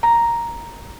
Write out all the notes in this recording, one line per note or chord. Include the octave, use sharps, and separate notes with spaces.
A#5